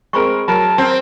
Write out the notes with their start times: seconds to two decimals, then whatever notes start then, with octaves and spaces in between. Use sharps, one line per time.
0.13 G#3 C4 G#4 A#4 B5 C#6
0.48 F#3 A#4 A5 B5
0.78 C4